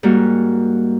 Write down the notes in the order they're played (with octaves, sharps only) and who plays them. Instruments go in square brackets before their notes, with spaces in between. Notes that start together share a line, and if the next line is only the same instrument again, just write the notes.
[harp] G#2 G3 A#3 F#4